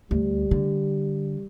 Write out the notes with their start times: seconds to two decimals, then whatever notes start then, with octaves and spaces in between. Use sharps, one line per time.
0.11 D2 G3
0.51 D3